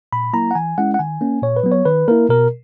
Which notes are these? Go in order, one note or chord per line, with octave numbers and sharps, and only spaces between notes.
A#2 B5
F#3 A#3 E4 A#5
F#5
E3 G#5
G#3 C#4 E4 F#5
F#5
D#3 G#5
A#3 C#4
A#2 C#5
B4
F#3 B3
C#5
D#3 B4
A#3 E4 A#4
B2 A#4